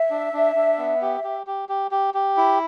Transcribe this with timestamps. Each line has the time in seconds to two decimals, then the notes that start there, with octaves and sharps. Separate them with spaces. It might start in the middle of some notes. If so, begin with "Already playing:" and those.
Already playing: E5
0.10 D4
0.33 D4
0.55 D4
0.78 B3
1.02 G4
1.24 G4
1.47 G4
1.69 G4
1.91 G4
2.14 G4
2.37 E4